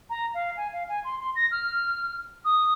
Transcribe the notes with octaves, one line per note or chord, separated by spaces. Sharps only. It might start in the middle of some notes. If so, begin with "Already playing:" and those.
A#5
F5
G#5
F5
G#5
C6
C6
A#6
F6
D#6